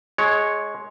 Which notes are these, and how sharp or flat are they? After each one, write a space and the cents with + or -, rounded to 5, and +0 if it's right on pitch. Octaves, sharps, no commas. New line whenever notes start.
G#3 +15 C#5 +0